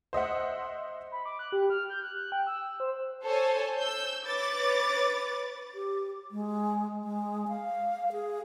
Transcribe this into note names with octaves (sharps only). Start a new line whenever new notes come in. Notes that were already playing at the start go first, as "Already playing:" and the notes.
C5 D#5 E5 F#5
B5
D6
F#6
G4
F6
G6
F#6
F#6
G5
E6
E6
C5
A4 C5 C#5 G#5 A5
E6 G6
B4 C#5 D6 A6
G4
G#3
G#3
F5
G#4